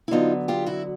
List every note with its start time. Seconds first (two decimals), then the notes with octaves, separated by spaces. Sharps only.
0.08 E4
0.11 D3 F#3 B3 D#4 F4
0.48 F4 G4
0.66 E4 F#4